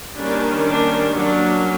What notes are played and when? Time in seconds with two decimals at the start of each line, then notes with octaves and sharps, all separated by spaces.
0.18 D#3 G3 A#3 C#4 D4
0.68 D4
1.17 F#3 A#3 C#4 D4